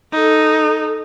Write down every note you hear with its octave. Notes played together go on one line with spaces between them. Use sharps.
D#4 A4